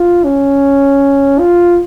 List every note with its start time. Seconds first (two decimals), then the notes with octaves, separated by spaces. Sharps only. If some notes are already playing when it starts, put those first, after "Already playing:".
Already playing: F4
0.25 C#4
1.39 F4